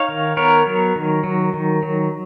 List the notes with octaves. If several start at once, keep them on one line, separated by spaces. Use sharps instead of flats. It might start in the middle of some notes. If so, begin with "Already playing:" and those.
Already playing: D#4 C#5 F5
D#3
B3 A#4 C#5
F#3
D#3
F#3
D#3
F#3